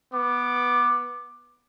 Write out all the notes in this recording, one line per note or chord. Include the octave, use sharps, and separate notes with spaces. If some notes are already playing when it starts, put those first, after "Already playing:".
B3 D6